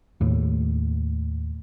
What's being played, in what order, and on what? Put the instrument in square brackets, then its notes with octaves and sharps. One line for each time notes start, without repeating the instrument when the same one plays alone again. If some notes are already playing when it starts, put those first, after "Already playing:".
[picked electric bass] D#2 A2